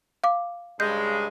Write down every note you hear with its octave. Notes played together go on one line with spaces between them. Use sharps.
F5 D6
G2 C#3 G#3 G6